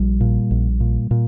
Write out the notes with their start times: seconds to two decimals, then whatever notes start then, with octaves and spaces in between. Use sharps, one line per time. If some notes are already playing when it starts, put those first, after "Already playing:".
Already playing: A#1 G3
0.21 A#2
0.51 A#1
0.80 A#2
1.11 A#2